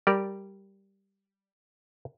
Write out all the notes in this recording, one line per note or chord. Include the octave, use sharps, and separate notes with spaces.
G3 G4 A#4 D5